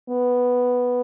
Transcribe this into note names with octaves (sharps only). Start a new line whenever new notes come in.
B3